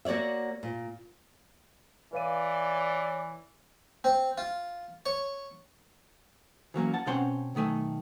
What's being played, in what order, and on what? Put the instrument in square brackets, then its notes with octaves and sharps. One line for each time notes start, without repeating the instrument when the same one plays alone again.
[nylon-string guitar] A#3 F#4 C#5 D5 E5
A#2
[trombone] E3 [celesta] B4 F5 D#7 [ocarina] C#5 [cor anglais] D5
[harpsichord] C4
F4
C#5
[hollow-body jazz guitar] E3 F#3 A#3 C#4
F#5 A5
B2 C4 C#4 F#5 C6
B1 D#3 A3 G#5